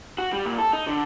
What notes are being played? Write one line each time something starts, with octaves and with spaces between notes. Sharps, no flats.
F#4
G3
A#2
A4
D#4
D3